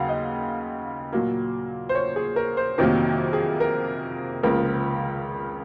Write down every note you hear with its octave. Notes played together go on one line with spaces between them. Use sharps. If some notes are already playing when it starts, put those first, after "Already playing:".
Already playing: D#2 C#3 F#3 F5 F#5
D#5
A#2 F#3 A#3
C5
C#5
G#4
A#4
C5
F2 C3 D#3 F#3 A#3 A#4
G#4
A#4
C#2 C#3 F3 A#3 A#4